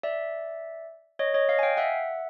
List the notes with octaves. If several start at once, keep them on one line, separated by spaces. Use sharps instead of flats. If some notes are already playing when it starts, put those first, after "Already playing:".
D5 E5
C#5 D#5
C#5 D#5
D#5 F5
G#5
F5 G5
E5 F#5